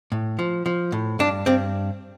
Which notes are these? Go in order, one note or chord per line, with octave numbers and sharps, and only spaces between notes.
A2
F3
F3
A2
G2 D4
G2 C4